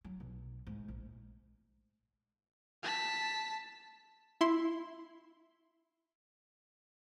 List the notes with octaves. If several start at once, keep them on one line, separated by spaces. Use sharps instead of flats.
F#3
B1
G#2
A#1
A5 B6
E4 C6